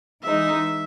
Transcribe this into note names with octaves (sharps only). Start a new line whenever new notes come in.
E3 G#3 D#4 E5